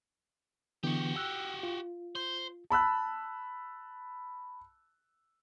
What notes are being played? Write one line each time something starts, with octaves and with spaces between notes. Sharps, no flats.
D3 E3 B3 F#4 G4
G5 E6 F#6
F4
C5
A5 B5 E6 F#6